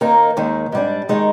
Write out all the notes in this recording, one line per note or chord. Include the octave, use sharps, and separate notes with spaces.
D#2 D#3 A#3 D#4 A#4
D#2 D#3 G#3
G#2 G3 D4
D#3 G#3 D#4